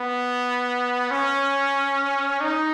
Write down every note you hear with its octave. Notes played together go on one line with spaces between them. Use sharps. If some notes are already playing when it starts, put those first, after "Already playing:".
Already playing: B3
C#4
D#4